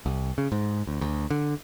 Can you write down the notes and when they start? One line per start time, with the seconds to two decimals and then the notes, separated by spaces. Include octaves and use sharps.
0.06 C2
0.38 C#3
0.52 G#2
0.87 D2
1.01 D2
1.30 D3